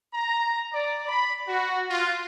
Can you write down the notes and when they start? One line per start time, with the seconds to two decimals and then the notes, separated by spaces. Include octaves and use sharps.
0.14 A#5
0.73 D5
1.07 B5
1.46 F#4
1.90 F4